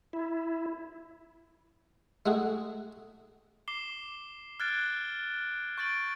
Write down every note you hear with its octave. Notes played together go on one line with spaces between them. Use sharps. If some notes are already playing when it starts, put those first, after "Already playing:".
E4
G#3 A3 F#4 G#4
D6 C7 E7 G7
F6 F#6 G#6 A6 D7
C#6 G6 A6 D7 F#7